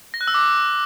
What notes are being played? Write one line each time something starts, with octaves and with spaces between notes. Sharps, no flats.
A#6
F#6
E6
D6